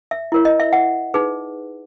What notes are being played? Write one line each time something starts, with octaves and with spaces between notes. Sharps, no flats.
E5
E4 A#4 C#5
D#5
E5
F#5
D#4 G#4 B4